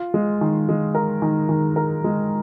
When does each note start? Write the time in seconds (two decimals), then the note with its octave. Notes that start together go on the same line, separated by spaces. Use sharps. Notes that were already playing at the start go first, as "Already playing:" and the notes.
Already playing: F4
0.14 G#3
0.41 D#3
0.69 G#3
0.95 A#4
1.22 D#3
1.49 D#3
1.76 A#4
2.04 G#3